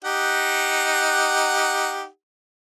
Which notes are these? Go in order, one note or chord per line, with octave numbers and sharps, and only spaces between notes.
D#4 G4 F#5